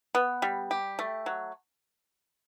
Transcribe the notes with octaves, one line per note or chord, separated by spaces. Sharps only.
B3
G3
G4
A3
F#3